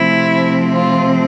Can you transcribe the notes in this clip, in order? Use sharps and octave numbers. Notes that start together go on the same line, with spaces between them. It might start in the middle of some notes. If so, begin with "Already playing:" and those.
Already playing: C3 F3 A3 C4 E4
F4